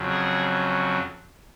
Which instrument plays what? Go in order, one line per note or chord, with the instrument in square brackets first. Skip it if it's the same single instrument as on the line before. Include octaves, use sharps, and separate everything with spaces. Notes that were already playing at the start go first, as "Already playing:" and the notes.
Already playing: [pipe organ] F2 C#3 F#3
G#4